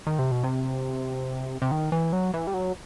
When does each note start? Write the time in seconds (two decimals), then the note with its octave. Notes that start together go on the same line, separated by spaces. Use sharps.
0.07 D#3
0.19 C3
0.31 B2
0.44 C3
1.62 C3
1.71 D#3
1.92 E3
2.13 F#3
2.34 E3
2.47 G3
2.54 F#3